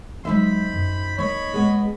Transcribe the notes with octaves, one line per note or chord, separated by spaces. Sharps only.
F#3 G#3 D#4 C5 E5 B5
F#2
A#3 C#5 D#5 B5
G#3 B3